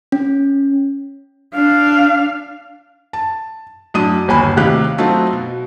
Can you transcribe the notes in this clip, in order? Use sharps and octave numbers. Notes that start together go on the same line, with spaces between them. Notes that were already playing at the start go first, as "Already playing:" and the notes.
C#4
D4 F5
A5
F#2 A2 D4 D#6 D#7
G1 D#2 G#5 B5
A2 C3 D#3 G4 F5 F#6
F#3 A3 C4 D#4 F4
B2